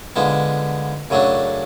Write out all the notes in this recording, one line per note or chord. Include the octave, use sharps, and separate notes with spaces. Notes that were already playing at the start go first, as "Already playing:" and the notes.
D3 F3 G#3 B3
F#2 C#3 F#3 A3 D4